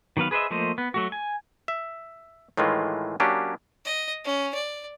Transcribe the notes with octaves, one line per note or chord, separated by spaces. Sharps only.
D#3 F#3 B3 B4 F5
G#4 B4 C5 D#5 E5
F3 A3 A#3 C5 D#5
B3
F#3 A3 F#4
G#5
E5
A2 D#3 E3 G#3 F4
F#3 A#3 C#4 D4 G4
D#5
C#4
D5